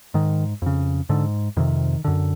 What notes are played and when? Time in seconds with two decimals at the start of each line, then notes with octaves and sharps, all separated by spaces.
0.14 G#2 D#3
0.62 F2 C#3
1.09 G#2 D3
1.57 F2 C3 D#3
2.04 F#2 D3